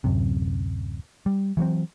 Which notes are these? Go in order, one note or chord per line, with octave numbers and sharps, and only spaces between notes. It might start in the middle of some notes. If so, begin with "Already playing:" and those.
D1 F#2 C3
G3
E3 F#3 A3 C4